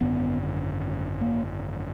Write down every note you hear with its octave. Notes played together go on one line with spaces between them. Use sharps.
G#1 F#2 D3 B3
A#3